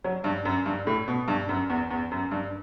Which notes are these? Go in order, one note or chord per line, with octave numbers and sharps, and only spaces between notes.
F#3
G2
F#2
G2
A2
B2
G2
F#2
E2
E2
F#2
G2